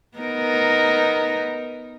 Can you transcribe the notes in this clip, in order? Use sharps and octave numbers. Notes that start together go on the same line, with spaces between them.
B3 D#4 A#4